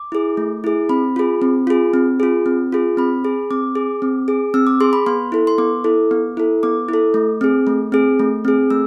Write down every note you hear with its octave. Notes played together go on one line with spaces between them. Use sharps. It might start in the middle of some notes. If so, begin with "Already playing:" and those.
Already playing: D6
E4 G#4
A3
E4 G#4
C4 B5
F4 G#4
C4
F4 G#4
C4
F4 G#4
C4
F4 G#4
C4 B5
G#4
C4 D6
G#4
C4
G#4
C4 E6
D6
G#4 C6
B5
B3 C6
E4 A4
C6
B3 D6
E4 A4
B3
E4 A4
B3 D6
E4 A4
A3
C4 G#4
A3
C4 G#4
A3
C4 G#4
A3 E6